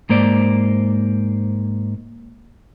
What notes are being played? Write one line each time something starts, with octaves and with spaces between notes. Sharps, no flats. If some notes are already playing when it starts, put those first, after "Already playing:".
G#2 A#3 C5 D5